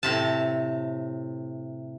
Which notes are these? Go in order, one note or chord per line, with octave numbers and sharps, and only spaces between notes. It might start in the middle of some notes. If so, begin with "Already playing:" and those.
A2 C3 A5